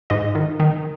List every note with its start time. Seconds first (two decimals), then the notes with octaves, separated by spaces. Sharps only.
0.10 G#2 D#5
0.35 D#3
0.60 D#3